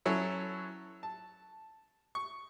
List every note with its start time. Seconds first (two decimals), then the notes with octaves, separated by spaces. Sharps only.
0.05 F#3 C#4 E4 A4
1.03 A5
2.15 C#6